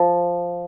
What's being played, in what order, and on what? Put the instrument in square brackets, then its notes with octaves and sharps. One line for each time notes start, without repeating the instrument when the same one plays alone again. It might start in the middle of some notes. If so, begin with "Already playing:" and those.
Already playing: [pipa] F3